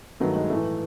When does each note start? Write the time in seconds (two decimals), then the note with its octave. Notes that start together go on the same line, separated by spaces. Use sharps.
0.20 G2 D#3 F#3 A3
0.36 G#3
0.50 A2 E3 A3